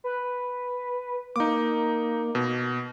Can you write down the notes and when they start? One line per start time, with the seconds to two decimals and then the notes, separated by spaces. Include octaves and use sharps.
0.04 B4
1.36 A#3 D#4 D6
2.35 B2